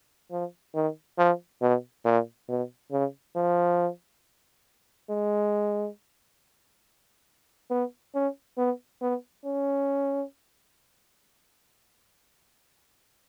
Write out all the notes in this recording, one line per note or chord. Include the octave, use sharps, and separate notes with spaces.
F3
D#3
F3
B2
A#2
B2
C#3
F3
G#3
B3
C#4
B3
B3
C#4